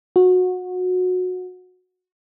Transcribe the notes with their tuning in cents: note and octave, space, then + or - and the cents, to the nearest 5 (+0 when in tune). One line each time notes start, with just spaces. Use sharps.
F#4 -20